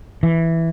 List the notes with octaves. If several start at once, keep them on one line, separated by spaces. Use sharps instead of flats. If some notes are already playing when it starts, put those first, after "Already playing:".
E3